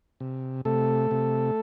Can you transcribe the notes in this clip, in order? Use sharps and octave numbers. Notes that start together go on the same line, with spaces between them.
C3
C3 A3 A4
C3